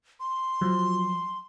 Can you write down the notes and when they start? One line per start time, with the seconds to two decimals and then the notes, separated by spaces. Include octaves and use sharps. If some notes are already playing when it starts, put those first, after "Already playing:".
0.20 C6
0.61 F3 F#3